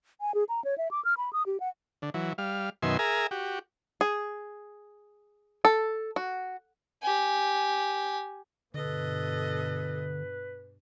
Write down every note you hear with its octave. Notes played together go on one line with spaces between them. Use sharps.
G#5
G#4
A#5
C#5
E5
D6
F6
B5
D#6
G4
F#5
D3
E3 F#3
G3 F5
F#2 B2 D#3 E5 G#5 C6
G#4 A#4 E5 G#5 A#5
F#4 G4
G#4
A4
F#4
G4 G#5
G2 B2 D3 A4 B4 D#5